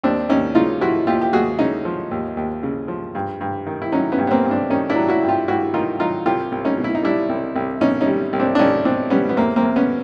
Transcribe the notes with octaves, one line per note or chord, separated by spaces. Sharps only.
D#2 C4 D4
D#2 C#4 D#4
C#3 D#4 F4
F3 E4 F#4
D#2 F4 G4
G4
D#2 F#4 G#4
C#3 C#4 D#4
F3
D#2
D#2
C#3
F3
G2
G2
D#3
E4
F#3 C#4 D#4
B3 C#4
G2
B3
A#3 C4
G2
C4 D4
D#3 C#4 D#4
D4 E4
F#3
E4 F#4
G2
F4 G4
G2 E4 F#4
D#3 D#4 F4
F#3 D#4 F4
C2 F4 G4
C2
C#4 D#4
B2
E4
D#4
G3 D4 E4
C2
C2
B2 C#4 D#4
C#4 D#4
G3
C2
C4 D4
D4
C2 C#4 D#4
B2 C4 D4
G3 B3 C#4
B3
E2 A#3 C4
A#3 C4
E2
B3 C#4